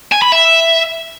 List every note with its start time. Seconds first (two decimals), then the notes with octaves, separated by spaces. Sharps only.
0.12 G#5
0.22 B5
0.32 E5